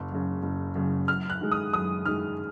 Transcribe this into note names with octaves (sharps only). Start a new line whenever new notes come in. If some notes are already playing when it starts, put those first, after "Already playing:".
Already playing: F#1
F#2 C#3
F#1
F#2 C#3
F#2 F6
F#6
D#3 G#3
D#6
F#2 D#6
D#3 G#3 F6